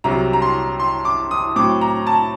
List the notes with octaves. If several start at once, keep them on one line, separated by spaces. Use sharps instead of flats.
C2 C3 F#3 A#5
A#5
C6
C6
D6
D#6
A2 F#3 C4 D6
A#5
A5